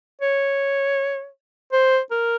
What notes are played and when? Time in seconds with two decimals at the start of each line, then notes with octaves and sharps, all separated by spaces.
0.22 C#5
1.73 C5
2.11 A#4